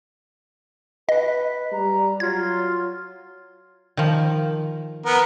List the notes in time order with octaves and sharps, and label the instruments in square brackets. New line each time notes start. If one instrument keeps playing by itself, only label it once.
[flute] B4 [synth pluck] D#5
[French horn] G3 [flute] A#5
[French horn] F#3 [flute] F4 [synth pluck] G#6
[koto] D#3 F3
[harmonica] B3 A#4